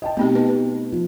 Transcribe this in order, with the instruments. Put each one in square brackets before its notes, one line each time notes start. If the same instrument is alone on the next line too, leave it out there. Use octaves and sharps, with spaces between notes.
[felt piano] D#5 G5 A5
[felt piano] B2 D#4 [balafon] A3 C4 G4
[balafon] B4
[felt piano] F3